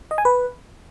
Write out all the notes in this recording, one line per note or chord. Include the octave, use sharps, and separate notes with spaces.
D#5
G#5
B4